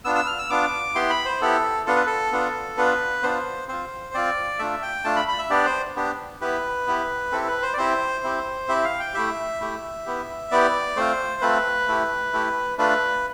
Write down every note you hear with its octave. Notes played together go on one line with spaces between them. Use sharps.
B3 D4 F4 E6
E6
F6
E6
B3 D4 F4 D6
B3 E4 G4 C6
B5
C5
B3 E4 G4 A4
B3 D4 F4 A4
B4
A4
B3 D4 F4
B3 D4 F4 B4
B3 D4 F4 C5
C4 F4 C5
C4 F4 D5
A3 D4 F4 E5
G5
A3 D4 F4 A5
B5
B5
E5
B3 D4 G4 D5
C5
B3 D4 G4
B3 E4 G4 B4
B3 E4 G4
C4 E4 G4 A4
B4
C5
D5
C4 E4 G4 C5
C4 E4 G4
C4 E4 G4 E5
F5
G5
A3 E4 G4 E5
A3 E4 G4
B3 E4 G4
B3 E4 G4 D5
A3 C4 F4 C5
A3 C4 F4 B4
A3 E4 G4
A3 E4 G4
A3 D4 F4 B4